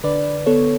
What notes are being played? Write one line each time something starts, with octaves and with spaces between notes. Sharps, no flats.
D3 B4 D5
B3 A4 C#5